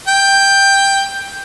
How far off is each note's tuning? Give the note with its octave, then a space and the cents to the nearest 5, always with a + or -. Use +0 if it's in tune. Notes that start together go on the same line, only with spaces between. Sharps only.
G5 +10